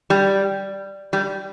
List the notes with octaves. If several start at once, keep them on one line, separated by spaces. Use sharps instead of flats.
G3
G3